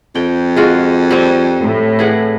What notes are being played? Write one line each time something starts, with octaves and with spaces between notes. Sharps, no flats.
F2 G5
G#3 F4 F#4
G3 C4
A2
E3 G#4 F#5